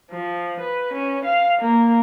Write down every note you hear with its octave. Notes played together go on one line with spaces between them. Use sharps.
F3
B4
C#4
F5
A#3